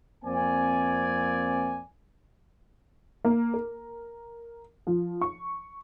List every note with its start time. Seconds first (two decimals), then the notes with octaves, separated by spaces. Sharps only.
0.25 F2 A#3 C4 D5 G#5
3.25 A#3
3.54 A#4
4.87 F3
5.21 C#6